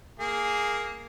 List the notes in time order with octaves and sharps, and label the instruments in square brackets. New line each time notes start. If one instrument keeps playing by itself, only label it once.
[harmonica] A#3 G#4